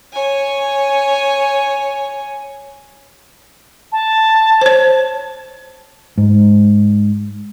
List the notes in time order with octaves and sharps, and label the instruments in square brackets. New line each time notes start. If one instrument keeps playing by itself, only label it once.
[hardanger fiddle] C#5 G#5
[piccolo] A5
[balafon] C5 C#5
[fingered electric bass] G#2